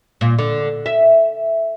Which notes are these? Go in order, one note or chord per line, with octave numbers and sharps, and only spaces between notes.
A#2
D3
E5